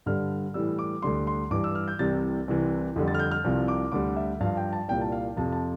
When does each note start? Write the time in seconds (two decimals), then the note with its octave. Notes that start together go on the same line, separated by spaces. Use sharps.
0.06 G2 D3 G3 F6
0.54 A2 E3 G3 E6
0.79 D6
1.02 D2 D3 G3 C6
1.27 C6
1.51 G2 E3 G3 D6
1.64 E6
1.75 F6
1.88 G6
1.99 C2 C3 E3 G3 A6
2.48 C2 C3 E3
2.96 F2 D3 G3
3.08 A6
3.14 F6
3.19 G6
3.31 F6
3.44 C2 C3 F3
3.68 D6
3.92 D2 D3 G3 D6
4.16 E5
4.40 G2 F3 F5
4.57 G5
4.73 A5
4.88 C2 A#2 G3 G5
5.01 A5
5.12 F5
5.36 F2 C3 F3 A5
5.52 A5